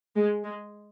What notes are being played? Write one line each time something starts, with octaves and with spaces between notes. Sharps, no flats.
G#3
G#3